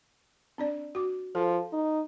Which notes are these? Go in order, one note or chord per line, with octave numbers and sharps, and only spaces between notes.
C4 D4 D5
F#4 D6
F3 A4
D#4